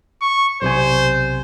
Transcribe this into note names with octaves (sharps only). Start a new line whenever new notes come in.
C#6
B1 C3 C5 G#5